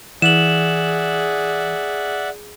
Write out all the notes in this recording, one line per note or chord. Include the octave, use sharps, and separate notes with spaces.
E3 G#4 D5 E5 F#5 E7 F#7